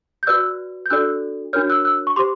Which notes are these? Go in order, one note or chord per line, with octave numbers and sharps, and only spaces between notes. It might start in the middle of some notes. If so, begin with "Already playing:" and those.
G6
F#4 B4 D5 E6 F#6
G6
D4 F#4 A4 D5 E6 F#6
D4 F#4 A#4 C#5 F6 G6
E6 F#6
E6 F#6
C#6
G4 C5 C6 D6